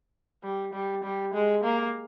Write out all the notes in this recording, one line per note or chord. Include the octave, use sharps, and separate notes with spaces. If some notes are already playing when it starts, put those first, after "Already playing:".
G3
G3
G3
G#3
A#3